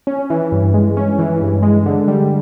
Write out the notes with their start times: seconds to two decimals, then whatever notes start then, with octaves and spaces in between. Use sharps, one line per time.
0.07 C#4
0.30 E3
0.52 G2
0.74 G#3
0.97 C#4
1.19 E3
1.41 G2
1.62 G#3
1.86 D3
2.08 G3